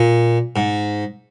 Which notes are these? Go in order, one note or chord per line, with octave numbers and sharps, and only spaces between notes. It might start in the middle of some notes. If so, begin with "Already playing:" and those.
Already playing: A#2
G#2